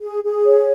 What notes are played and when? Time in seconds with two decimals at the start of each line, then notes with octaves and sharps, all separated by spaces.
0.01 G#4
0.24 G#4
0.45 C#5